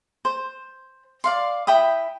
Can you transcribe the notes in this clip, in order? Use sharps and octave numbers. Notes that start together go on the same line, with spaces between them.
C5
D5 F5 C6
E4 G5 B5 D#6